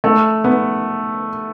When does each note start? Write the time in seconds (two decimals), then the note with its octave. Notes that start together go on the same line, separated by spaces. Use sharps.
0.04 A3
0.44 B3